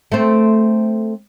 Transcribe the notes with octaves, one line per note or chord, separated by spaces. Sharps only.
A3 C4